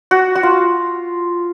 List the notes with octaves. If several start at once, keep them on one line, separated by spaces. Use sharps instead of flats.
F#4
F#4
F4